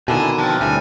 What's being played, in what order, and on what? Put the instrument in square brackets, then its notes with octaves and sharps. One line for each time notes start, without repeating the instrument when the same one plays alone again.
[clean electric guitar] B2 D3 D#3 [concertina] E4 A5 [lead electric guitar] G#4 G#5
[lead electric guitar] F3 [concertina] C4 D4 A#4
[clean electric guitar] D2 A2 G3 [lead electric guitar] G#5